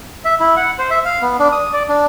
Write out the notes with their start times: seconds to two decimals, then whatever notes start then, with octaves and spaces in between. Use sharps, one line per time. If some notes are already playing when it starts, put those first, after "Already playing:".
0.25 E5
0.40 E4
0.57 F#5
0.78 C5
0.90 E5
1.05 F5
1.21 B3
1.39 D4
1.52 D#6
1.73 D5
1.89 D4